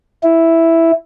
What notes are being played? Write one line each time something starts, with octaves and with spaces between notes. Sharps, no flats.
E4